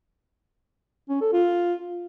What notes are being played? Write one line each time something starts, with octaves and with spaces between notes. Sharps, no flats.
C#4
A4
F4